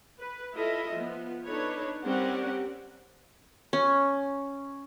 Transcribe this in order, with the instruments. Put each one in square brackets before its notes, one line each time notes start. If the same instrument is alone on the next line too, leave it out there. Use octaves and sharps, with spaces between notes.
[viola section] B4
E4 F4 A4 D#5 E5
F3 B3
D4 D#4 A4 B4 C#5
G3 C4 C#4 G4 A#4 F#5
[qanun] C#4